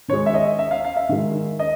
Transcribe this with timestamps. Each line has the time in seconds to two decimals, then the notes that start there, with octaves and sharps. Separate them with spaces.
0.08 D#3 C#5
0.13 G#3
0.26 E5
0.34 D#5
0.59 E5
0.71 F5
0.85 F5
0.97 E5
1.09 D#3 G#3
1.59 D#5